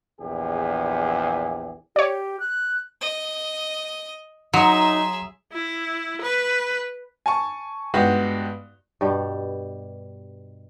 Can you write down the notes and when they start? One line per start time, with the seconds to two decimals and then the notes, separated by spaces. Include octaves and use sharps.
0.20 A#1 E2 G4 G#4
1.96 G4 C#5 D5
2.40 F#6
3.01 D#5
4.54 F#3 D#4 G#4 E5 A#5 C6 D#6
5.53 E4
6.22 B4
7.26 G#5 A5 C#6
7.94 G2 G#3 B3 F#4 G4
9.01 G2 B2 G3